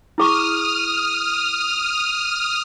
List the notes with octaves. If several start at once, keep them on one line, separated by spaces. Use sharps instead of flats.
E4 G#4 C#6 D#6 F6